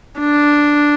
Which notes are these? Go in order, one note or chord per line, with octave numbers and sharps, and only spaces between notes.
D4